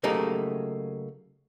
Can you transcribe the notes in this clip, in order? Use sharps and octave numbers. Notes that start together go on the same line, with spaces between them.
C#3 F#3 A3 A#3 D#4 G4